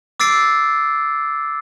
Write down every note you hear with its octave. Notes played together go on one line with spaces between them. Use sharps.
D6 E6 A6 C7 D7